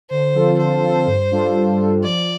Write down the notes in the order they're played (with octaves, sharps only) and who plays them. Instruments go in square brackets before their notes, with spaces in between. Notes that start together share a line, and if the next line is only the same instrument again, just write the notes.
[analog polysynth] D3 [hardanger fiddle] C5
[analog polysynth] F3 C4 F4 A4
[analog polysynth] D3 [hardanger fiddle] C5
[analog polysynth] F3 C4 F4 A4
G2
G3 D4 F4 A4
G2
G3 D4 F4 A4
[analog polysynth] F3 [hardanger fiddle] D5